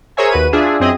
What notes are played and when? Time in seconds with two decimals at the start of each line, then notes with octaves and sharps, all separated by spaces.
0.17 G#4 A#4 C5 C#5 E5 G#5
0.31 D#2 F#4 B4 D#7
0.52 D4 F4 G#4 E5
0.80 F#2 C4 G#4 D#5 E5 D#6